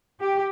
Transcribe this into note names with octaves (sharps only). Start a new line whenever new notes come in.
G4